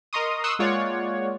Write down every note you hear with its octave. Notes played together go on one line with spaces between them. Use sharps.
A#4 D#5 A#5 C6 C#6 D#6
C6 C#6 D#6 E6 F#6
G#3 A#3 F4 C#5 D5 F#5